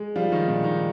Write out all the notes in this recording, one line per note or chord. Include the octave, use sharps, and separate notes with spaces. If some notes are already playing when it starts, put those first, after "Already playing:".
Already playing: G#3
F3 G3 F4
D#3 D#4
A#2 D4
D#3 D#4